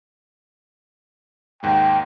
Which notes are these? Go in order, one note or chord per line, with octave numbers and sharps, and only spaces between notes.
D#2 G#2 A#3 G5